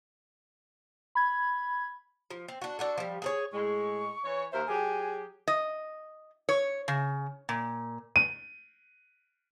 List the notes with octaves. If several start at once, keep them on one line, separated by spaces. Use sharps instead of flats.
B5 G#6
F3
C4
D4 F#4
D4 F#4 A4
F3 G3
G#4 A4 C#5
A2 G#3 C#6
E3 C#5
D#2 A#4 C5 E5
F#3 G4 G#4 G#5
D#5
C#5
C#3
A#2
D#7